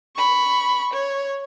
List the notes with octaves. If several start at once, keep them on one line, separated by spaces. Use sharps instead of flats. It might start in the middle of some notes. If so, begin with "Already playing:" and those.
B5 C#6
C#5